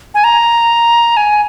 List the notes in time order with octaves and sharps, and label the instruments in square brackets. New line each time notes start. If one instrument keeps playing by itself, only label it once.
[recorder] G#5
A#5
G#5